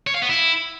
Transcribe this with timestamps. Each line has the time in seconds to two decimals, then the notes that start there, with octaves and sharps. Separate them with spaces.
0.07 C#5
0.14 F5
0.22 B3
0.29 E4